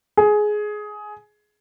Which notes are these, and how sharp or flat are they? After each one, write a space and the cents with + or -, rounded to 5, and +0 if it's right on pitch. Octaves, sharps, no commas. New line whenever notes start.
G#4 +15